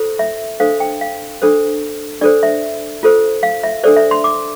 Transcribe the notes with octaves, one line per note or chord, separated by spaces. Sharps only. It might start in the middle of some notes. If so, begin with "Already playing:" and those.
Already playing: F4 A4 C5
E5
D4 A4 C5 F5
G5
F5
D4 A4 C5
D4 A4 C5 D5
E5
F4 A4 C5
F5
E5
D4 A4 C5 D5
E5
C6
D6